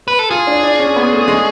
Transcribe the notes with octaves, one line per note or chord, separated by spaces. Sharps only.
B4
A4
F4 G#4
D4
D4
C#4
B3
A3
G#3